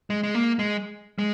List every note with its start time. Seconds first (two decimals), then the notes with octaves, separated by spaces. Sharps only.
0.10 G#3
0.23 G#3
0.35 A#3
0.59 G#3
1.19 G#3